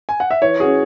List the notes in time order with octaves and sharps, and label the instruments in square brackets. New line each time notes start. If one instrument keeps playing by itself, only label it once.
[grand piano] G#5
F#5
E5
[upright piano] E3 [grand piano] C#5
[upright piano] C#4 F#4 [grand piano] G#4